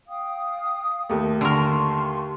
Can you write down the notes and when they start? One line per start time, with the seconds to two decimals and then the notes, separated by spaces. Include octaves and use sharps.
0.08 F5 G5 D#6
1.10 D#2 A3
1.41 D3 A#4 A5 C6 C#6